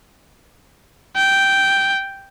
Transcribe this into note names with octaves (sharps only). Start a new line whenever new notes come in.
G5